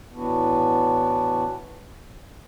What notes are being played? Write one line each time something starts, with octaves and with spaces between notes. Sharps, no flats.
A2 E3 B3 D4 F#4